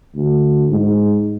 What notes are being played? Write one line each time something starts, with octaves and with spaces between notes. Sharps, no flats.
D2
G#2